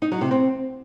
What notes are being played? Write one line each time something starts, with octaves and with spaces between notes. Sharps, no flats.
D#4
F#3
C3
C4